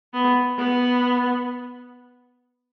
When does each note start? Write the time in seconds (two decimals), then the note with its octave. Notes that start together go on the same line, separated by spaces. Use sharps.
0.14 B3
0.58 B3